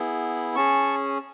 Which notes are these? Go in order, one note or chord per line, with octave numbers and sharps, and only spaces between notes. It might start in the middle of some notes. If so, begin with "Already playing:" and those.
Already playing: B3 E4 G#4
C#4 G#4 A5 C#6